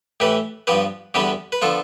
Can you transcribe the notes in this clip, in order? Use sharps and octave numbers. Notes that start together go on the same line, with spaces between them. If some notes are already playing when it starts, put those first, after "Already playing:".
A2 E3 A3 G4 B4
G2 F3 B3 G4 B4
E2 D3 G3 B3 G4 B4
B4
D3 F3 B3 F4 A4